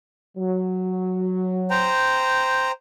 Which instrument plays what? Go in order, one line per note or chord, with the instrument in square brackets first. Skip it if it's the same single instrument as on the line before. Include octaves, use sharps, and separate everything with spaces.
[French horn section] F#3
[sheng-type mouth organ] C5 G5 A#5